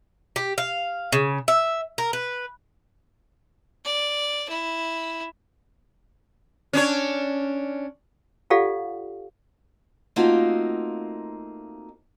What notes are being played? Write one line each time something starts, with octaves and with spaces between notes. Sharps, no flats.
G4
F5
C#3
E5
A#4
B4
D5
E4
C#4 D4 C#5
F4 G4 A4 D5 F5 F#5
A3 A#3 C4 D#4 F4 F#4